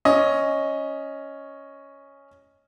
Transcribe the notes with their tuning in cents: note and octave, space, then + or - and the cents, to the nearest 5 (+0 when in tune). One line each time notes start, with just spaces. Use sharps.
C#4 +0 D#5 +0